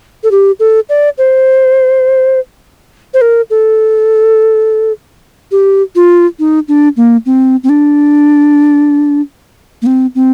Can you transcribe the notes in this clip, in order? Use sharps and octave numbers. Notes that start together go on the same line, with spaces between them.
A4
G4
A4
D5
C5
C5
A#4
A4
G4
F4
D#4
D4
A#3
C4
C4
D4
A#3
C4
C4